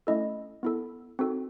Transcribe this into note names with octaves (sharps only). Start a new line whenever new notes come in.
A3 C#4 E4 A4 D#5
B3 E4 A4
C4 D#4 F#4 A4